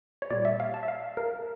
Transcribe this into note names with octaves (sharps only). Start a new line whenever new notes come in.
C#5
A#2 G3 D5
E5
F5
A5
E5
F5
A#4